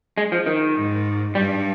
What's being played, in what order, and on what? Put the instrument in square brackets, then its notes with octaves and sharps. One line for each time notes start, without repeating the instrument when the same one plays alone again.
[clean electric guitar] G#3
F3
D#3
[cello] G#2
[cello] G2 [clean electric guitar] G3